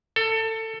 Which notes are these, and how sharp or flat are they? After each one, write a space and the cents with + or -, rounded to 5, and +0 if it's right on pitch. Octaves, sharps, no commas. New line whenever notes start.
A4 +20